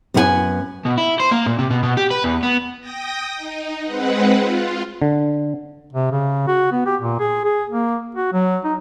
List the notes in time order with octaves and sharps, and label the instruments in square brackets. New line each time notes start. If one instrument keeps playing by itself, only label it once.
[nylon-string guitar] F#2 B3 D#4 F4 F#5 G#5
[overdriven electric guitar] B2
E4
C5
A#3
A#2
C3
B2
B2
G4
B4
E2
B3
[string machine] G5 D#6 A#6
D#4
G#3 C4 B4 F#5
F4
[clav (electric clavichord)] D3
[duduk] C3
C#3
F#4
B3
G4
A#2
G#4
G#4
A#3
F#4
F#3
D#4